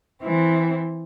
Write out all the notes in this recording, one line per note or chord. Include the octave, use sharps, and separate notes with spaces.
E3 C4